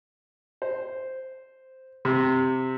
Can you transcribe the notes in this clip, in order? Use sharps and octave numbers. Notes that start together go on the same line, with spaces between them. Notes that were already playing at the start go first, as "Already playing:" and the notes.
C5
C3